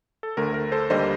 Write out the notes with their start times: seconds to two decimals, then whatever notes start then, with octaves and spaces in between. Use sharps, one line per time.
0.23 A4
0.37 D2 D3 A3 A#4
0.54 A#4
0.72 A4 C5
0.90 D#2 D3 G3 A#3 C5 D#5